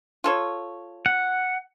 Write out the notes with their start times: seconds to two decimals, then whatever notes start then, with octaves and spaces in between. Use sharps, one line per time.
0.24 F4 A4 C#5
1.06 F#5